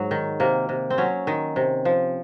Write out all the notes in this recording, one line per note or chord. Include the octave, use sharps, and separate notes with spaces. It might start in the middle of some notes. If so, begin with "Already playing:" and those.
Already playing: G#2 F#3
D#3
C3 A#3
C3
C4
F#3 C#4
D#3
C3
F3